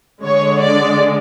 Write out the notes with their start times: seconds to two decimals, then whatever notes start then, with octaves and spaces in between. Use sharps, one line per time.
0.24 D3 G#3 C#5
0.62 D5